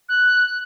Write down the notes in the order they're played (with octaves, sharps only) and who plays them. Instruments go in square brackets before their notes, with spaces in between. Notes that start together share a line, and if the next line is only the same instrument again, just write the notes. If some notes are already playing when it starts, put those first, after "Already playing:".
[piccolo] F#6